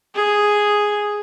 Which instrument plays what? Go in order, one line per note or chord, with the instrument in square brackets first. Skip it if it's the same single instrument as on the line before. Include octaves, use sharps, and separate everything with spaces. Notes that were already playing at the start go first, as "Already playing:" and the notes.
[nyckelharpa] G#4